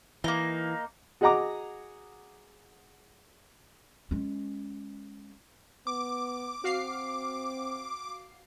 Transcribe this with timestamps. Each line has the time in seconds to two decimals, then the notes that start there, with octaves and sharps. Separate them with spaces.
0.24 E3 A#3 D#4
1.21 F#4 G#4 D#5 F#5 A#5 D6
4.11 G#3 C#4
5.87 B3 D6
6.64 C4 F#4 F5 C7